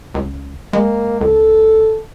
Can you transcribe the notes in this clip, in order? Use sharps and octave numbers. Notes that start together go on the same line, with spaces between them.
C#2
G#3 A#3
C#2 A4